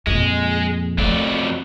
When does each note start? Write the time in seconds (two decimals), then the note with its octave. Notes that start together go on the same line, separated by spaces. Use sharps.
0.07 F2 A#2 G#3
0.98 F2 F#3 A3 D5